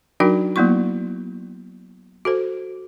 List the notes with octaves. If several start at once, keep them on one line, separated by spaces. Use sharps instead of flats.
F#3 D4 D#4 F#4 A#4 G5
F#3 A#3 B3 E4 C#6
F#4 A4 C5